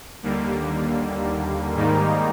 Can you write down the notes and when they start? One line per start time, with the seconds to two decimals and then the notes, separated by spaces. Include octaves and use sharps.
0.23 D#2 D3 G3 A#3
1.74 G#2 D#3 G3 A#3 D#4